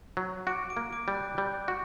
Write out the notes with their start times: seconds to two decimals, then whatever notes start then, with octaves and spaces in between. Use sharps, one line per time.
0.17 F#3
0.47 F#4 D6 D7
0.69 D6 D7
0.77 A#3
0.92 D6 D7
1.08 G3
1.15 F#6
1.37 G3 G6
1.68 F#4